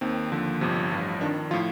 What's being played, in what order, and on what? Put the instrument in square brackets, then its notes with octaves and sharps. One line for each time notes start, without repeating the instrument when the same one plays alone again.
[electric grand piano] D#2 D#3 C4
D#2 D3 F3
G1 F2 C3 F3
A1 G2 F3
F2 D#3 D4
A2 F3 F4